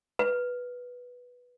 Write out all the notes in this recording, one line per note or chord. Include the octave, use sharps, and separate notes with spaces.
B4